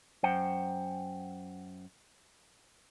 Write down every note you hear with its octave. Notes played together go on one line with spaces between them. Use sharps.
F#2 C5 F#5 G5